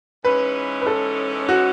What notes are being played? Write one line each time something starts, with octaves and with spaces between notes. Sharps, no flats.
G#2 E3 G#3 C#4 B4
B4
A4
F#4